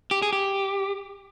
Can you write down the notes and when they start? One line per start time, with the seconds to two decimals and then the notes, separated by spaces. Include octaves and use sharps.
0.11 G4
0.22 G#4
0.33 G4